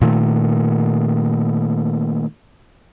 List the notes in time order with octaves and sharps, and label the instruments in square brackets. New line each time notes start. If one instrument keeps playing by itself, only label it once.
[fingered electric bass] A#2 D#3 A3